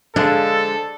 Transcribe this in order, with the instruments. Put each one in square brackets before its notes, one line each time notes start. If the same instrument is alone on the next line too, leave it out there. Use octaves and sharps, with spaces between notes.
[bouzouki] D3 F3 G#3 [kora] D4 [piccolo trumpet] A4